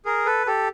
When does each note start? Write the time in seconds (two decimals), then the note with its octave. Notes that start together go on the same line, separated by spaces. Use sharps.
0.05 G#4 A#4
0.26 A4 B4
0.46 G4 A4